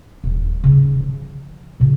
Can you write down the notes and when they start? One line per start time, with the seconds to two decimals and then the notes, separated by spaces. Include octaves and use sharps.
0.24 D#1
0.64 C#3 D#4
1.00 F3
1.80 A#2 C#3